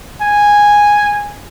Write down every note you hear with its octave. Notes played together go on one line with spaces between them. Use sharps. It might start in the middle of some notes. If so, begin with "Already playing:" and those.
G#5